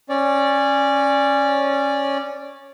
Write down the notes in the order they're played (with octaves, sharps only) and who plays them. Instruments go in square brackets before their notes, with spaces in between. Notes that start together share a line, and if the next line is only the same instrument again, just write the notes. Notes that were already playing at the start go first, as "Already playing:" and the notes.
[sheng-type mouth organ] C#4 D5